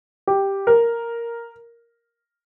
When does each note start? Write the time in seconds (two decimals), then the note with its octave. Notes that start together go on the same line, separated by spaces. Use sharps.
0.27 G4
0.67 A#4